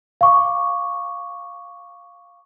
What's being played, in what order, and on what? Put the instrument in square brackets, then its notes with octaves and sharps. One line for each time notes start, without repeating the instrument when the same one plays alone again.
[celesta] F5 C#6 D6